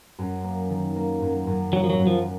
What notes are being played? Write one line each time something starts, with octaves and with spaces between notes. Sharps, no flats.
F#2
A#3
D#3
A#3
F#2
F#2
F#3 A#3
F3
F#3
F#2
F3